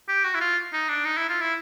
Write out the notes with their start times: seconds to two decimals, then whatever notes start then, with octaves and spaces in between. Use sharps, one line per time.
0.08 G4
0.24 F#4
0.34 E4
0.41 F4
0.73 D#4
0.89 D4
1.05 D#4
1.17 E4
1.29 F4
1.41 E4